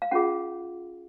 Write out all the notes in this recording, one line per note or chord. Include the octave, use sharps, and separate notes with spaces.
F5
C#4 F4 G#4 F#5